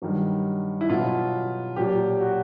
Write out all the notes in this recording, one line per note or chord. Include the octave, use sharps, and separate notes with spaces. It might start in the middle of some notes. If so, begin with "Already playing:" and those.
G2 D#3 F#3
E4
B2 F#3 F4
A#2 F#3 G4
F#4